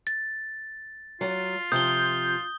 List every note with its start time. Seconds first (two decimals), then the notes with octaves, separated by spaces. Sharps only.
0.07 A6
1.21 F#3 F4
1.72 C3 F3 D#6 G6 G7